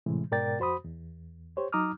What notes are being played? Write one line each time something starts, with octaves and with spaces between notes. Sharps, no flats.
A2 C3 E3 G#3
G#2 B2 A#4 D5 G5 A6
F2 F#4 C5 B5 D#6
E2
G4 C5 C#5
F#3 D#4 A#5 D6 D#6 F6